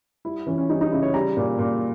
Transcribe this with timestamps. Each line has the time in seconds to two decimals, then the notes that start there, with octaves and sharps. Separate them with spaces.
0.25 G3 E4
0.47 E3 C#4
0.58 C#4
0.70 G3 D#4
0.81 D#4
0.92 C#3 E4
1.03 C#5
1.14 G3 A#5
1.37 A#2
1.59 A#2